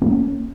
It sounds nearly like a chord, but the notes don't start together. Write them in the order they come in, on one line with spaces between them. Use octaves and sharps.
B3 A#3 C#4